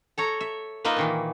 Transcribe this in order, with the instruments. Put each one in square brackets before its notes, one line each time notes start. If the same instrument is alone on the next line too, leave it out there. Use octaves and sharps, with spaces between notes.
[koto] A4 C#5 A#5
E5
A#3 D#4 F4 B4 D#5 E5
A#2 D#3 E3